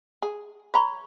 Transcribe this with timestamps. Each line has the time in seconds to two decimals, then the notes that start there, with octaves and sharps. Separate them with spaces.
0.22 G#4
0.74 C#5 A#5 B5 C#6